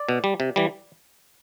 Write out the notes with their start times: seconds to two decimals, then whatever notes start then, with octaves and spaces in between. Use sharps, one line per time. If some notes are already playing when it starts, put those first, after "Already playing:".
Already playing: D5
0.09 B2
0.24 G3
0.40 C3
0.56 E3 G3